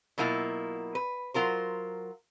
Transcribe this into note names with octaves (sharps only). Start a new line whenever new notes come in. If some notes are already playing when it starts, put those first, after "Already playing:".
B2 F#3 A#3 E4 F4
B4
F#3 F4 A#4 C5